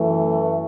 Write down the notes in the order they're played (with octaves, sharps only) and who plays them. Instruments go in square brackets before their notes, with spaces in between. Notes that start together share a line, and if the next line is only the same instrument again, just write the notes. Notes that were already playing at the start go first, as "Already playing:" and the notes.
Already playing: [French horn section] F#2 E3 A3